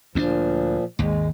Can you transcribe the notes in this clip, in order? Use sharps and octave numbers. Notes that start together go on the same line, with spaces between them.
D2 A#2 F3 C4 D4
G#1 D#2 G#3